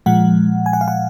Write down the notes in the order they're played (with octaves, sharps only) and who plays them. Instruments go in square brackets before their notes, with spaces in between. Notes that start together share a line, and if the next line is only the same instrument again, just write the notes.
[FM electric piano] A#2 F3 G#3 F#5
G#5
F#5
F5
F#5